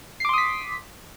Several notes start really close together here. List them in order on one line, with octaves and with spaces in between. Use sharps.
C7 D6 C6 D#6 B6